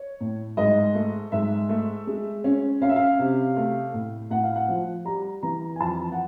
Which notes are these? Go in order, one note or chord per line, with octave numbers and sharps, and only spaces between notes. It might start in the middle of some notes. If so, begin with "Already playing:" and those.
Already playing: C#5
A2
G#2 D#5
A3
G#2 E5
A3
G#3
C#4
C#4 F5
E5
F5
C3
A3
A2
A2 F#5
F5
F#5
F3
G3 A#5
E3 A#5
G#5
F2 A5
F#5